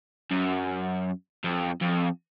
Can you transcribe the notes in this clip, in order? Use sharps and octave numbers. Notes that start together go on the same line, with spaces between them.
F#2
F2
F2